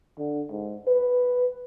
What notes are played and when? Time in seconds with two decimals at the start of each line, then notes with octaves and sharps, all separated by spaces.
0.18 D3
0.51 G#2
0.87 B4